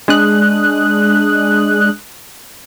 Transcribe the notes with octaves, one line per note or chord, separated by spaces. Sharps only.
G#3 D4 D#6 F#6